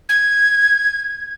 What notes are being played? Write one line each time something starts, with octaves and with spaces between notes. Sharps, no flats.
G#6